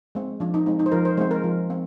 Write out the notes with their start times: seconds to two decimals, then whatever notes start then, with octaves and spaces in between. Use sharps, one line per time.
0.15 G#3 C4
0.40 F3 D4
0.54 D#4
0.66 G#3 C4 D#4
0.79 D#4
0.86 C5
0.92 F3 A#4
1.05 C5
1.17 G#3 C5
1.21 C4
1.31 A#4
1.44 F3
1.70 C4